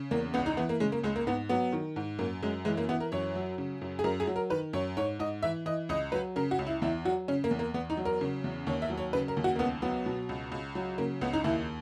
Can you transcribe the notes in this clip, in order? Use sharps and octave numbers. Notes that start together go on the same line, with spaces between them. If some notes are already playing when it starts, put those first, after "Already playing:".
Already playing: C#3
E2 A#3
C#2 B3
D#4
E3 B3
A#3
C#3 G#3
A#3
C#2 G#3
A#3
G#2 B3
F#3 B3
D#3
G#2
F#2 A#3
F#2 G#3
E3 G#3
A#3
E3 B3
A#4
F#2 C#5
F#3
C#3
F#2
G#4
F#2 A#4
G#4
F#3
A#4
D#3 B4
F#2 C#5
G#2 C#5
G#2 D#5
E3 E5
E3 D#5
C#2 D#5
F#3 B4
C#3 A#4
F#4
C#2
E4
E2 E4
F#3 F#4
C#3 C#4
A#3
E2
A#3
E2 B3
D#4
F#3
A#4
C#3
E2
D#2 C#5
E5
F#3
C#5
C#3 B4
A#4
D#2
F#4
A#3
C#2 B3
F#3 B3
B2
C#2
C#2
F#3
C#3 A#3
C#2 B3
D#4
D#2 E4